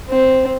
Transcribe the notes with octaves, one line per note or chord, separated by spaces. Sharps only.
C4